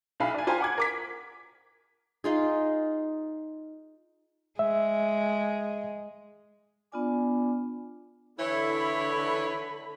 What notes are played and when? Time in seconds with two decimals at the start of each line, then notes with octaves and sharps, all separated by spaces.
0.20 B1 E4 F5 B5
0.34 D5 G#5
0.47 F4 G4 C5 G#5 A#5 B5
0.60 F#5 D6 G#6
0.78 A#4 D6 B6
2.24 D#4 F4 G#4
4.59 G#3 E5
6.92 B3 D4 F4 D5 G#5 D6
8.39 D3 E3 E4 C#5 B5